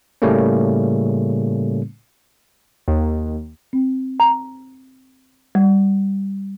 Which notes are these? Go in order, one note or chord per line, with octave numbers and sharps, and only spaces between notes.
A2 C#3 G3 A3 A#3 C#4
D#2
C4
A#5
G3